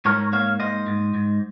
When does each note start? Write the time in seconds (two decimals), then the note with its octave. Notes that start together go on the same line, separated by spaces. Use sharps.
0.05 G#2 A#4 C#5
0.33 A#3 C#5 F5
0.60 G#2 C5 D#5
0.87 G#2
1.14 G#2